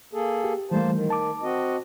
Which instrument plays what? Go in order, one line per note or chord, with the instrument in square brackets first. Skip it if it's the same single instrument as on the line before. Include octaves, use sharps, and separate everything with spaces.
[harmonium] A#3 G#4 A4
[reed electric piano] G4
[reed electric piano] E3 G3 A3 [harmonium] A#3 C5 A5
[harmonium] D#3
[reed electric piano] A5 D6
[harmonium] C4 F#4 D#5